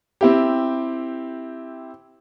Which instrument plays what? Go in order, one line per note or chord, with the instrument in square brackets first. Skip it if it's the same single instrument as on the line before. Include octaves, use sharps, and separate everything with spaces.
[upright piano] C4 E4 G4